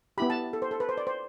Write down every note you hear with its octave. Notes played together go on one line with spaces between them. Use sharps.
B3 E4 G4 B5
A5
A4
C5
A4
B4
C5
D5
C5